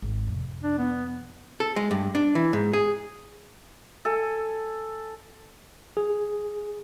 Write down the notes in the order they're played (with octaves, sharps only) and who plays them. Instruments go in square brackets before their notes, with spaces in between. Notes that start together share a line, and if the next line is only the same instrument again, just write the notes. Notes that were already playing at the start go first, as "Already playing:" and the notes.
[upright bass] G#1
F2 C3
[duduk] D4
B3
[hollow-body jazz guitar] A4
G#3
G2
D4
E3
G#2
G#4
[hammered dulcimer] A4 G#5
[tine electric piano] G#4